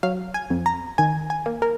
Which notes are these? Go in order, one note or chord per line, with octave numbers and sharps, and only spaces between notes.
F#3 F5
G#5
F2
A#5
D#3 G#5
G#5
A#3
A#4